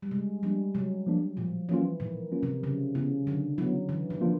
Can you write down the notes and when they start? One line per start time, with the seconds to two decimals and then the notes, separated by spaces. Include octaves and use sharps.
0.02 G3
0.11 C3 G#3
0.43 F3 G3 A#3 D4
0.75 C3 F#3
1.06 F3 A#3 D4
1.37 A#2 F3
1.69 E3 F#3 A#3 C#4 F4
2.00 A#2 D#3
2.32 F#3 A#3 C#4 F4
2.43 C3
2.63 C#3 F#3
2.95 C#3 B3 E4
3.26 D3 F#3
3.58 F#3 B3 E4
3.89 D3 E3
4.10 D#3
4.21 F3 A#3 D4 F4